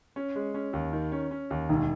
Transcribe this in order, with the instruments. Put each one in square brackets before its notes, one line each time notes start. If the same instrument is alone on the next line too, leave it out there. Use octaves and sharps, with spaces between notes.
[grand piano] C#4
G#3
C#4
D#2
D#3
C#4
C#4
D#2
[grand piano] E1 [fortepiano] D#3